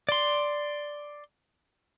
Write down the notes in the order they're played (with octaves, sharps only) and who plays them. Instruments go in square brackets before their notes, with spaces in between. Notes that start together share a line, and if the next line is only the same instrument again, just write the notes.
[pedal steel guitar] D5 C6